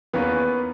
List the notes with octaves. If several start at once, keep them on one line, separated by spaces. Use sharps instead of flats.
E2 D#3 A#3 B3 C#4 B4